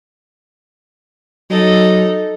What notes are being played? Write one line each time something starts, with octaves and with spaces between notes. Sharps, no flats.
F#3 D#4 A4